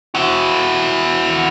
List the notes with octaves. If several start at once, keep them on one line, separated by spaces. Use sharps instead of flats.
E4 F#4